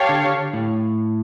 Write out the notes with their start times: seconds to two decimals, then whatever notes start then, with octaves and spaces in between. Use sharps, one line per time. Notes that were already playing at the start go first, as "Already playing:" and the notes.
Already playing: G4 C#5 F5 A5
0.09 D3
0.53 A2